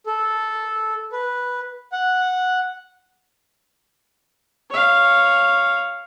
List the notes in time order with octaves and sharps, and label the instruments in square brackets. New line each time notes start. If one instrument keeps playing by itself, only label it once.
[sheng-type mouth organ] A4
B4
F#5
[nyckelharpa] C#5 F5